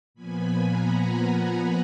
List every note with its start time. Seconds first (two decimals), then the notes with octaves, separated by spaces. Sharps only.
0.14 A#2 F3 B3 G#5 B5
0.66 F#5 A#5